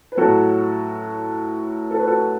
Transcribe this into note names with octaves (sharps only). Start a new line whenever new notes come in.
B4
A2 F#3 F#4 A4
A4
B4
F#4 A4